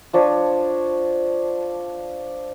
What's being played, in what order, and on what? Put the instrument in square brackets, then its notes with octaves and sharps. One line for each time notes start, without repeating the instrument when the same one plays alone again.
[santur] F3 D4 C#5